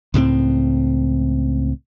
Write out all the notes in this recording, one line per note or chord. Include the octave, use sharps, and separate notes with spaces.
C#2 A2 F3 C4